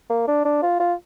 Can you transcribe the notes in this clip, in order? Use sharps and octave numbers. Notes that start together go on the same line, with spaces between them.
A#3
D4
D4
F4
F4